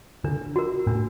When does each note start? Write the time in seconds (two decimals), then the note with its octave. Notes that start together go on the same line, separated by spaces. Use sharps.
0.24 D3 D4
0.56 F#4 A#4
0.87 A2 D4